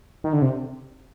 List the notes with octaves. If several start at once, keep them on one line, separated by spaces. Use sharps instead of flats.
D#3
D3
C3